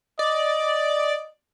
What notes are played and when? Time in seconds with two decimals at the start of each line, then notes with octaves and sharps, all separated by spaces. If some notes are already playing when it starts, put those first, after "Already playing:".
0.19 D5 D#5